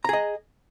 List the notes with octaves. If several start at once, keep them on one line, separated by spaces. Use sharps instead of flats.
G#4 D#5 A#5